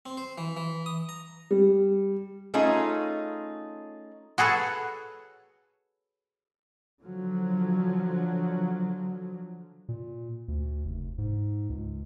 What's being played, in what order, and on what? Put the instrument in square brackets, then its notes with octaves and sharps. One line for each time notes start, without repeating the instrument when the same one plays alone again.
[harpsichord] C4
C5
E3
E3
D#6
A#5
[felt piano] G3
[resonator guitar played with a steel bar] A3 C#4 D#4 F4 G#4
[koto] F#4 G#4 A4 B4 C#5
[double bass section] D3 F3 F#3
[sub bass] A#2
D2
F1
G#2
C#2